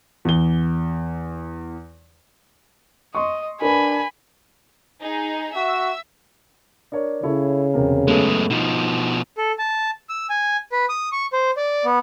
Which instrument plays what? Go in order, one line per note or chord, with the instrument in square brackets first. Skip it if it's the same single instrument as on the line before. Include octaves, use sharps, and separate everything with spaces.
[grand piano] E2 G7
[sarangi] D#5 [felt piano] C6 C#6
[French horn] D4 [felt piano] A#4 B4 [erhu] G#5 [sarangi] B5
[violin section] D#4 G#4
[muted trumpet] F#4 [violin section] E5 E6
[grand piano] D4 A#4 C#5
[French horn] C#3 [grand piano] E4 A4 C#5
[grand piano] E1 C3 A#4
[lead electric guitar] F#2 G#3 [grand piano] A3 B3 A4
[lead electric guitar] B2 F3 [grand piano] D#4
[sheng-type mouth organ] A4
A5
E6
G#5
B4
D#6
C#6
C5
D5
B3